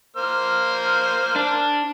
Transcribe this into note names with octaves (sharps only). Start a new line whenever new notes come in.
A#3 C5 F6
D4